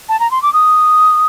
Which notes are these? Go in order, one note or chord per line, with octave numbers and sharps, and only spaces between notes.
A5
A#5
C6
D6
D#6